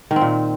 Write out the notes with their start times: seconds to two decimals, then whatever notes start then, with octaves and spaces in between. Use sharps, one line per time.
0.11 D#3
0.16 C4
0.21 A#2